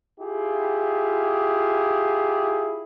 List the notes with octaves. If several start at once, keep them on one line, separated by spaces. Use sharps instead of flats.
E4 F4 G4 G#4